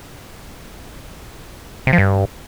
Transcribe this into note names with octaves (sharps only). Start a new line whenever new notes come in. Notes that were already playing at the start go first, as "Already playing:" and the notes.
C3
F3
G2